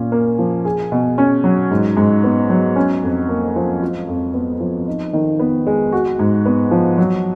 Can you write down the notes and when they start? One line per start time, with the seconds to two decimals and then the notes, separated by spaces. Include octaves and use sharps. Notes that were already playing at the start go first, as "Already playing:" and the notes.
Already playing: A#2 C#4
0.12 A#3
0.39 F3
0.65 G#4
0.92 B2
1.18 C#4
1.44 F#3
1.71 G#2
1.97 G#2
2.24 B3
2.50 F#3
2.76 C#4
3.03 F2
3.29 A#3
3.56 F3
3.82 F4
4.09 F2
4.34 B3
4.60 F3
4.88 D#4
5.13 D#3
5.39 B3
5.67 G#3
5.92 F#4
6.19 G#2
6.46 B3
6.71 F3
6.98 F#3